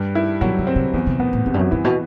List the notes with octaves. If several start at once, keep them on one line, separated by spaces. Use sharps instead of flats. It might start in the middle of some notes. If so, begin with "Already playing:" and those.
Already playing: G2 G3
E4
B2 F#3
C3
C4
C3
E2 E3
C3
B2 B3
A2
F#2 C3
G2
F#2
G2 E3
B2